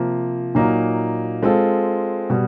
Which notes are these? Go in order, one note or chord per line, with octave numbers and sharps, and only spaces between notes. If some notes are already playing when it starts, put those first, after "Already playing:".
Already playing: C3 F3 A#3
A#2 F#3 A#3 D#4
G#3 C4 F4 A4
B2 G3